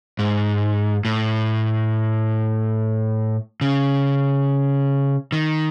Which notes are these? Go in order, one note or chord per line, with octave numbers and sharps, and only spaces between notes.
G#2
A2
C#3
D#3